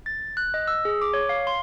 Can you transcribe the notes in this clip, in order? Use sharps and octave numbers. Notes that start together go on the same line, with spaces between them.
A6
F#6
D#5
E6
G#4
D6
C#5
F5
C6